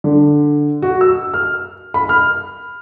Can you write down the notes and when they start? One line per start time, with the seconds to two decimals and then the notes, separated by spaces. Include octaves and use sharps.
0.04 D3
0.82 F#4
1.01 E6
1.34 F6
1.94 B5
2.09 F6